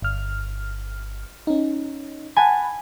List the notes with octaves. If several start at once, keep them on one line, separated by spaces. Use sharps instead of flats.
G1 F6
C#4 D#4
F#5 G#5 A5 B5